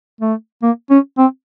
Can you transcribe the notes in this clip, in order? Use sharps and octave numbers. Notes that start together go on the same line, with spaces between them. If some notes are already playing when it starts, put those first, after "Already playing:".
A3
A#3
C#4
C4